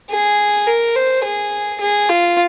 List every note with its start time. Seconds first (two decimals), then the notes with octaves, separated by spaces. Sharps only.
0.11 G#4
0.67 A#4
0.95 C5
1.24 G#4
1.80 G#4
2.09 F4